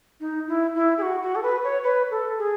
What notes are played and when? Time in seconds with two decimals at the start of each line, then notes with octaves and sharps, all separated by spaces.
0.20 D#4
0.48 E4
0.75 E4
0.98 G#4
1.02 F#4
1.22 F#4
1.35 A4
1.42 B4
1.64 C#5
1.84 B4
2.11 A4
2.38 G#4